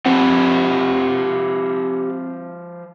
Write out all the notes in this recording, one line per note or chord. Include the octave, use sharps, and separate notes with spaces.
F3 C4 G4 B4 C5 F#5